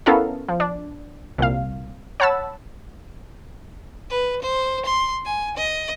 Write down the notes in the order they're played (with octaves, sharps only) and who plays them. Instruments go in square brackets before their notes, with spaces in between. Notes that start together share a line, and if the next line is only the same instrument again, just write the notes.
[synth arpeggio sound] B3 C#4 E4 A4 A#4 F5
F3
D4
C2 A#2 F5
C#5 F#5 A5 B5 E6
[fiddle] B4
C5
C6
G#5
D#5